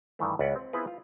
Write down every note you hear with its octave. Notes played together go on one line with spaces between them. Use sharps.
G2 D#3 E3 A3
C#2 B4 D5 F#5
C4
B3 C4 E4 F4 G#4 B4
F4